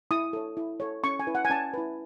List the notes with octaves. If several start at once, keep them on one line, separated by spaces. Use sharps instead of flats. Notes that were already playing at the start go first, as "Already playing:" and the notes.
E4 D#6
A4 C#5
E4
A4 C#5
C#4 C#6
G#5
E4 B4
F#5
G#5
C#4 A5
E4 B4